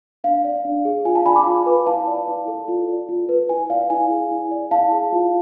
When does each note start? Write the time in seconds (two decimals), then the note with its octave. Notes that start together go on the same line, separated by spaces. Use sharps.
0.24 D4 F5
0.44 D5
0.65 D4
0.85 G#4
1.05 F4 G#5
1.15 F5 A5
1.26 D5 G#5 B5
1.36 B5 D6
1.46 F4
1.66 B4
1.86 E4 F5 A5
2.07 D5
2.28 E4
2.48 A4
2.68 F4
2.88 D5
3.09 F4
3.29 B4
3.49 E4 G#5
3.70 D5 F5
3.90 E4 G#5
4.11 G#4
4.31 E4
4.51 D5
4.71 E4 F5 A5
4.92 G#4
5.13 F4